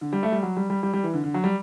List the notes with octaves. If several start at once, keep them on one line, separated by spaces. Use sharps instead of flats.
D3
G3
A3
G3
F#3
G3
G3
G3
G3
E3
D3
D3
F#3
G3